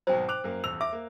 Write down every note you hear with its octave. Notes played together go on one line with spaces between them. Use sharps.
G#1 B2 F#3 C5 G5
D6 F#6 F7
F#2 A#3
D#1 E2 E6 F7
E5 D6
A#3